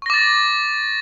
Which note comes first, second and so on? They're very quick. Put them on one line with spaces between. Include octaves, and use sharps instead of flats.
C#6 A#6 D6 A6